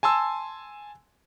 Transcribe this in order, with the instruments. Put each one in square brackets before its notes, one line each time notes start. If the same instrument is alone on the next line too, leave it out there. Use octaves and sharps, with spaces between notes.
[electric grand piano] G#5 A5 C6 E6